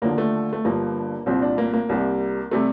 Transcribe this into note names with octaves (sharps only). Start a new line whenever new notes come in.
D#2 D3 F3 A#3
A3
A3
G1 G2 F3 A#3
C2 A#2 F3 C4
D4
A#3
A#3
C2 C3 G3
C3 G3 A3